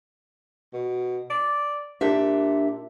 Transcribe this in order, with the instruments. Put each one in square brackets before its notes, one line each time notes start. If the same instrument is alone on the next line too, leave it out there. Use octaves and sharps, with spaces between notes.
[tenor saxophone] B2
D5
[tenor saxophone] A#2 [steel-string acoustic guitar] D4 G4 E5